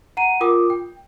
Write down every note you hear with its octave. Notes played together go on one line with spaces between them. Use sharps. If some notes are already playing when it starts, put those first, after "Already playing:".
F#5 A#5 D#7
F4 A#4 G5 D6 D#6
G5